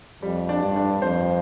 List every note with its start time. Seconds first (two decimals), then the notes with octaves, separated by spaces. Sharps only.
0.22 F2 G3
0.49 D4
0.62 G2
0.76 D4
1.02 F2 C5